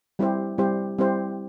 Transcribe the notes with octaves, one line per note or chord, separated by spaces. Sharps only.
G3 C4 E4 G4 C5
G3 C4 E4 G4 C5
G3 C4 E4 G4 C5